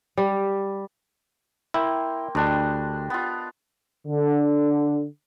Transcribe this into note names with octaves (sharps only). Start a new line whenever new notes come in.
G3
A#3 E4 G5 C6
D2 G3 D4 D#5
B3 F4
D3